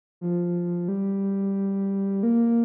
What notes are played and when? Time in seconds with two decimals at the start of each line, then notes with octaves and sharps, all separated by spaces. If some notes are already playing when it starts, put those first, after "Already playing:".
0.21 F3
0.88 G3
2.23 A#3